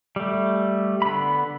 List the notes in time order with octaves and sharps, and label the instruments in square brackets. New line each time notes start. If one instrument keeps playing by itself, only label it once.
[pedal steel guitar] G3 A3
D3 B3 B5